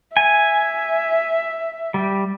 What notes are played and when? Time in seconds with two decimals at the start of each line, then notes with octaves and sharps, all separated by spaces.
0.17 E5 G#5
1.94 G3